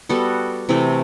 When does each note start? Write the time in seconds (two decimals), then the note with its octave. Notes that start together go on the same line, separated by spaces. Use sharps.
0.09 G3 B3 F#4 A4
0.69 C3 E3 A3